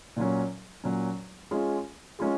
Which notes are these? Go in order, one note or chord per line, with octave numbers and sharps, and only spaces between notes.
A#2 F#3 C#4
A#2 F#3 C#4
G#3 C#4 F4 G#4
G#3 C#4 F4 G#4